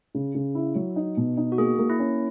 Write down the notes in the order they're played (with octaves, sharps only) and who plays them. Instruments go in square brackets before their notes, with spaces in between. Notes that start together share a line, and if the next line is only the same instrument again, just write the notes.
[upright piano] C#3
C#3
E4
F#3
D#4
B2
D#4
[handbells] F#4
[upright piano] A#3 [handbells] G#4
[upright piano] A#3
[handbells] E4
[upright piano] C#4